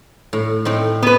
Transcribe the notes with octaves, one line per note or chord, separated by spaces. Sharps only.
A2
A2 C4 D#4
B3 B4